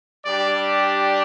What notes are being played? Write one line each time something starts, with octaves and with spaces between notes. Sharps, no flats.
G3 D4 G4 D5